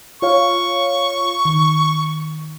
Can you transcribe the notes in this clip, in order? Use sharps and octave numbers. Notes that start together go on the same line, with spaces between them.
F4 C#5 F5 C#6
D#3